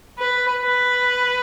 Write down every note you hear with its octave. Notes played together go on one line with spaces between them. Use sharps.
B4
B4